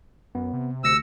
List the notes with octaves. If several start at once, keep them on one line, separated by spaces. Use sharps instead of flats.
F#2 B3
C3
D2 E6 A#6 C#7